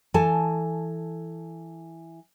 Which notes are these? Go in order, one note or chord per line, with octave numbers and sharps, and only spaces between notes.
E3 A4 G#5 A5